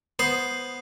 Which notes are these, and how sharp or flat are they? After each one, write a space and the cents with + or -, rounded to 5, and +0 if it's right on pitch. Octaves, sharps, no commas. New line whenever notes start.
B3 +0 C5 +0 D#6 +0